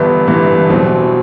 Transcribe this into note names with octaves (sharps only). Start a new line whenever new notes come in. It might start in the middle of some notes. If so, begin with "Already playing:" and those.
Already playing: G1 G2 E3 B3 E4
G1 G2 E3 B3 E4
E2 B2 F#3 C4